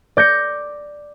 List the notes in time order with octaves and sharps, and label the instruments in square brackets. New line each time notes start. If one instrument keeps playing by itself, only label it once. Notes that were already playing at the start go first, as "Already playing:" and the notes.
[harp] D5 G6 A#6 C#7